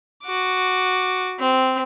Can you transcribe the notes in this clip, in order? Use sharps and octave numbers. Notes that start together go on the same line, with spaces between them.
F#4 D6
C4